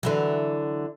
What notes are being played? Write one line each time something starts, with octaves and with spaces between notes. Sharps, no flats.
D3 E3 F#3